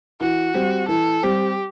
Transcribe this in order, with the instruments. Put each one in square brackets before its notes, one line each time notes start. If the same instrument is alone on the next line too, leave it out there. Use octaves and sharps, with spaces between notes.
[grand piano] E3 [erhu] F#4
[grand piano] G3 C4
[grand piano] E3 [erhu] A4
[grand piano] G3 C4 [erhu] G4